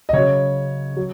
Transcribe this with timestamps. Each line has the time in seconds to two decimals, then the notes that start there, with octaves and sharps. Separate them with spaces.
0.09 D#5
0.13 C#3 F#3 C#5
0.97 F#3